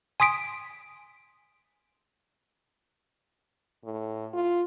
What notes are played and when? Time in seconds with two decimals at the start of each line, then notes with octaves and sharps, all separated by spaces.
0.20 G#5 C6 D#6 B6 D7
3.84 A2
4.34 F4